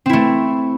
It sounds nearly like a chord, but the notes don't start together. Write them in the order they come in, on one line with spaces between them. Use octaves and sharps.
C4 E4 A3